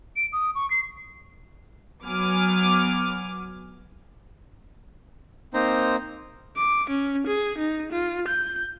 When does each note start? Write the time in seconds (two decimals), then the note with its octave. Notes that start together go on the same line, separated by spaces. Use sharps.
0.16 D7
0.33 D#6
0.55 C#6
0.70 C7
2.03 F#3 B3 G#5 D6 F6
5.54 A#3 C4 D#4 C5 A#5
6.57 D6
6.90 C#4
7.27 G#4
7.58 D#4
7.92 F4
8.28 G6